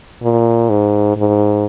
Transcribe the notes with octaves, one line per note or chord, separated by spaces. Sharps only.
A#2
G#2
G#2